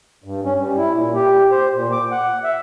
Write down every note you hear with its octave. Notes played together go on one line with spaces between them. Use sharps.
G2
C#4
G3
E4
A#2
G4
C5
A#2
D6
F#5
E5